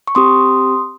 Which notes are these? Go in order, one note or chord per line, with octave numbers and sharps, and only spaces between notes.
C#6
C4 G4 C6 D#6